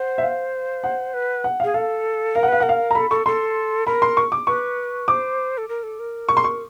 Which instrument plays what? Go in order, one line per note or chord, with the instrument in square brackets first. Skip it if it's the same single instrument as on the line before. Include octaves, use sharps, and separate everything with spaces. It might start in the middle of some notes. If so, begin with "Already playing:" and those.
Already playing: [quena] C5 [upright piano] F#5
[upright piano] E5
F5
F#5
[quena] B4
[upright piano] F#5
[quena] G#4 [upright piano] F5
[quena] A4 [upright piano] F5
[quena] A#4 [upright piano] F5
[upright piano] F#5
[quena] B4 [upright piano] F5
[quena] A#4 [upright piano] F#5
[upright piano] F5
A#5
[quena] A4 [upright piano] B5
[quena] A4 [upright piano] C#6
[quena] A4 [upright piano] C6
[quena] A#4 [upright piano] B5
[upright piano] C6
C#6
D6
[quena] B4 [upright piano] C#6
[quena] C5 [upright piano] D6
[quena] A4
A#4
A4
A#4
[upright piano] C#6
C6
C#6